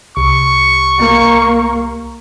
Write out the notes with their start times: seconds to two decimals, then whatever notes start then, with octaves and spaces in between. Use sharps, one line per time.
0.17 C2 C#6
0.98 A#3